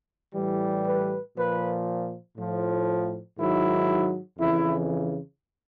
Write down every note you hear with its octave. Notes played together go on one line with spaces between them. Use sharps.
A2 E3 G3
B4
A#2 F3 B4
A2 F3
G#2 D#3 F#3 E4
F2 C#3 E3 E4